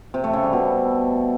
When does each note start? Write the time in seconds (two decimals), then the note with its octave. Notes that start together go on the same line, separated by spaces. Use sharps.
0.14 C3
0.24 A3
0.33 C#3
0.43 G3
0.53 B2